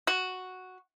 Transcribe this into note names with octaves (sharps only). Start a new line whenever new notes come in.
F#4